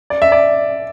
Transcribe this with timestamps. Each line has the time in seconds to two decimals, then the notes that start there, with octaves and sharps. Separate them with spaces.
0.10 D5
0.22 E5
0.32 D5